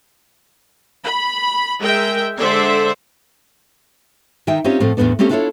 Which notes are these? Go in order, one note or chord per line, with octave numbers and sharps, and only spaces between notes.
B5
G#3 A#4 E5 G5
D3 G#3 A4 C5 D5 E5
D#3 D#4 E5 G5
C4 C#4 D#4 F4 G4 C#5
A2 F3 A3 C4
E2 A2 C3 D#3 B3 D4
A3 A#3 C4 C#4 G4 A4
D4 E4 F4 A4 A#4 C#5